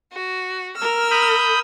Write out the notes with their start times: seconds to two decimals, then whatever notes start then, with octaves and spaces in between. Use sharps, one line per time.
0.11 F#4
0.75 A#4 E6 F6
1.11 B5 D#6 G6